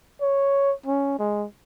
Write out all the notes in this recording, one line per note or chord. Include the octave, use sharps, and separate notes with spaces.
C#5
C#4
G#3